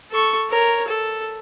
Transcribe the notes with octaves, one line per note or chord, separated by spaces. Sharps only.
A4 C#6
A#4 C#5
A4